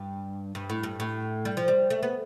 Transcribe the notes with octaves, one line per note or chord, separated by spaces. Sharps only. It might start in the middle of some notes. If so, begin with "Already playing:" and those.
Already playing: G2
G2
A2
G2
A2
G3
F3
G3
A3
B3